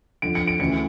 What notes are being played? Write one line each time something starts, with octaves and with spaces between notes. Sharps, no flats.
F2 D3 D7
C#7
D7
D2 C#3 E3 C#7